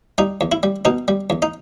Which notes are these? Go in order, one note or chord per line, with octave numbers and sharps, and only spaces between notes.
G3 D#4
E2
E4
G3
B2 D#4
G3
E2
D#4